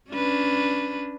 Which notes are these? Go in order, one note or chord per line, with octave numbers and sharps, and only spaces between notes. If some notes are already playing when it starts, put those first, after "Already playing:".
C#4 D4 B4